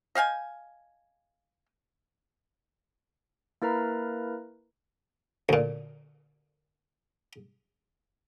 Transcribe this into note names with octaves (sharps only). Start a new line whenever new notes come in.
D#5 F5 G5 G#5
A#3 E4 A#4 B4 A#5
D2 A#2